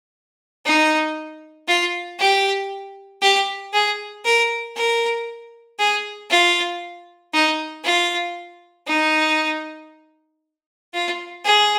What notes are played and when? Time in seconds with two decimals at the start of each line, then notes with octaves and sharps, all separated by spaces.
0.65 D#4
1.68 F4
2.19 G4
3.22 G4
3.73 G#4
4.25 A#4
4.76 A#4
5.79 G#4
6.30 F4
7.33 D#4
7.84 F4
8.87 D#4
10.94 F4
11.45 G#4